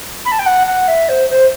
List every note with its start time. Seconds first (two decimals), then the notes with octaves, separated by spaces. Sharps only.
0.25 B5
0.31 A5
0.39 G5
0.46 F#5
0.67 F#5
0.88 E5
1.08 C5
1.29 C5